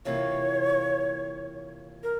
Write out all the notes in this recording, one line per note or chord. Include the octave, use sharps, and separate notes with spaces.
C3 E3 A#3 F4 C#5
A#4